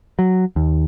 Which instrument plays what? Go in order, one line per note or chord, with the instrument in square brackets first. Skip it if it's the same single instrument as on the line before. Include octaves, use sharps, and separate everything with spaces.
[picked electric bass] F#3
D#2